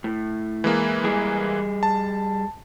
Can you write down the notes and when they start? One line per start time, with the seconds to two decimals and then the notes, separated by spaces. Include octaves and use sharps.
0.04 A2
0.64 E3 G#3 A#3
1.04 G3 G#4
1.83 A5